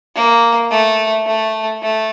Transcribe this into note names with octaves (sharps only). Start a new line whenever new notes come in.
A#3
A3
A3
A3